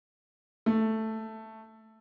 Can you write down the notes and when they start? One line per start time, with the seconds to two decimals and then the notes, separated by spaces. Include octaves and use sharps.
0.66 A3